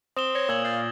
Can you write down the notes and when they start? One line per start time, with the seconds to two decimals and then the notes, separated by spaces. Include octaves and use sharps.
0.16 C4 D#6 E7 G7
0.35 C#5 A#6
0.49 A#2 E6 G#6 F#7
0.64 F5 G6 A6